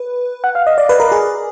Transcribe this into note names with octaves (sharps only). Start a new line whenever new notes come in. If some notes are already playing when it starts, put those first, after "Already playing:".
Already playing: B4
F#5
F5
D#5
D5
B4
A#4
G#4